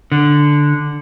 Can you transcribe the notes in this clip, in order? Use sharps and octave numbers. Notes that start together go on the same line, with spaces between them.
D3